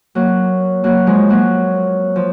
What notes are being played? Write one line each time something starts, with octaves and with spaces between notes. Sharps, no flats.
F#3 A#3
F#3 A#3
F3 G#3
F#3 A#3
F3